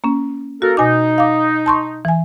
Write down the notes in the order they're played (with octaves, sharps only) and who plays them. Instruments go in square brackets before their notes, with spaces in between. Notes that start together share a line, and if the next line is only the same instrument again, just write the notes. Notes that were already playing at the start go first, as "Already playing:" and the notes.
[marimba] A#3 C#4
[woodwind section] A#3 A4 A#4 [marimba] F#4
[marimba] B2 G#5 D6 [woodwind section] D#4
[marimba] F5 D6
A5 C6 C#6
E3 G#5